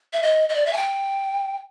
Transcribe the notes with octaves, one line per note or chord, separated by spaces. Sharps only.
E5
D#5
D#5
D5
E5
G#5
G5